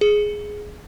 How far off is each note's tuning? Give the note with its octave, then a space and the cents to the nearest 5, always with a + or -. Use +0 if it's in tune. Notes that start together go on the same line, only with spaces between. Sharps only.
G#4 +5